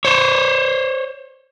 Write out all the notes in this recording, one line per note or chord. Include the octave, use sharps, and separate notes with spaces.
C5 C#5